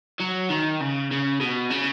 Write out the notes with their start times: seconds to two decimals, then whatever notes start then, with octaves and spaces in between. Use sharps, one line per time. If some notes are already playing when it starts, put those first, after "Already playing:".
0.20 F#3
0.50 D#3
0.80 C#3
1.11 C#3
1.41 B2
1.71 C#3